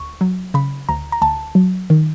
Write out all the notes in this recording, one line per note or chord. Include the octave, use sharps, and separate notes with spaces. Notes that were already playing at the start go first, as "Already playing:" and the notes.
Already playing: D2 C#6
F#3
C#3 B5
D2 A#5
A#5
D2 A5
F#3
D#3